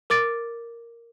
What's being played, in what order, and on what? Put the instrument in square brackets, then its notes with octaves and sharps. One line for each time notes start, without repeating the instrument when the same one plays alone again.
[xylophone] A#4 D6 A6 D7